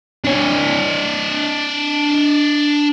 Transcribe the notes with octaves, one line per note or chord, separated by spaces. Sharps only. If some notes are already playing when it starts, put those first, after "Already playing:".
D4 C#5